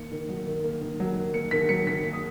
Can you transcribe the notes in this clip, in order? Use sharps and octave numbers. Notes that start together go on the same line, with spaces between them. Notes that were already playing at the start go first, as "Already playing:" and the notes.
Already playing: D#3 A#3 C#7
D#3
F#3
D#3
A#3
D#3
F#3
D#3
A#3 C#7
D#3 B6
F#3 C#7
D#3 B6
A#3
D#6